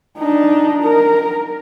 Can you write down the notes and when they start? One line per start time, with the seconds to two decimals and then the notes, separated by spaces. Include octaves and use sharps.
0.18 D4 D#4
0.83 A#4